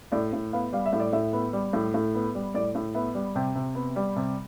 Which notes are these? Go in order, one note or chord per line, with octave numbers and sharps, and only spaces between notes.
A2 D5
A2
B3 F5
G3 F5
E5
A2
D5
A2 E5
B3
G3
A2
A2
B3
G3
A2 D5
A2
B3 E5
G3
C3 G5
C3
B3
G3
C3